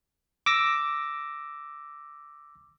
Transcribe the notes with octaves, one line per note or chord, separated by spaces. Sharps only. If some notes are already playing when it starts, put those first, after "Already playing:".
D6 E6 A#6